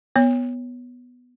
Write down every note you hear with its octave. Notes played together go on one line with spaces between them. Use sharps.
B3 C#5